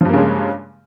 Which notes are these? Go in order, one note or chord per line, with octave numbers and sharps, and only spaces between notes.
G2 C#3 F3 G#3 A#3